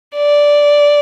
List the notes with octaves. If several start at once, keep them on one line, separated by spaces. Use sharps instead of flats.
D5